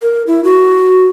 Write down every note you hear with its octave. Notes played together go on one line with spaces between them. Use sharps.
A#4
E4
F#4